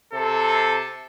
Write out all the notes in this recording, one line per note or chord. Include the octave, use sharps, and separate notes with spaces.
C3 A4